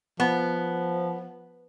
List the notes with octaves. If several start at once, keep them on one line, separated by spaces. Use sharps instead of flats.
F3 B3